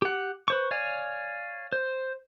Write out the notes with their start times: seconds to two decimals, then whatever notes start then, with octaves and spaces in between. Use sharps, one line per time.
0.02 G4 F#5
0.48 B4 C5 C#6
0.71 C#5 D5 F5 G#5
1.72 C5